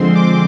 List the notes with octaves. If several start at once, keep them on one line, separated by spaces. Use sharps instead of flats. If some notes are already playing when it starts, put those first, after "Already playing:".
Already playing: D3 F3 G#3 C4 C6
D6